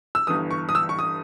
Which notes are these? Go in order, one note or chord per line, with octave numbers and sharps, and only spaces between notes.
E6
G1 G2 E3 D#6
C#6
D#6
E6
C#6
D#6